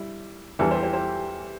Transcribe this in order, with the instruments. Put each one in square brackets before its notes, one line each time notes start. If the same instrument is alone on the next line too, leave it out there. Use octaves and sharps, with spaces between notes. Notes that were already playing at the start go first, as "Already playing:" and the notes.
Already playing: [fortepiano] G3 [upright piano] E4
[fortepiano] E2 E3 G3 [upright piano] E4 A4
[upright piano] G4 C5
G4 C5
G4 C5